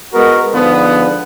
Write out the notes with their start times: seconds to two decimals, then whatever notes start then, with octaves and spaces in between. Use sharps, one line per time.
0.13 G#3 B3 F#4 A#4
0.53 G#2 D3 F3 B3